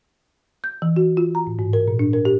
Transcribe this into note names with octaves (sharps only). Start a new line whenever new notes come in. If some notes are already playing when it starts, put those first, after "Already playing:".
G6
E3
F#4
F4
A#5
A2
G#2
A#4
A#2
D4
A#4
G4